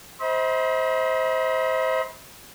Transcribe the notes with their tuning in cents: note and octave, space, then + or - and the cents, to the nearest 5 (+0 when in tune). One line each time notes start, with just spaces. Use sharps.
C5 +0 D#5 +45 B5 -35